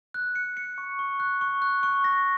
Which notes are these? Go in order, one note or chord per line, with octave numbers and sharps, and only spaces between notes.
F#6
C#7
C#7
C#6
C#6
F#6
C#6
F#6
C#6
A#6